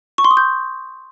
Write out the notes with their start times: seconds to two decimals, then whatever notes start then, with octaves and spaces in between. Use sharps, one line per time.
0.18 C#6
0.25 C6
0.31 D#6
0.37 G6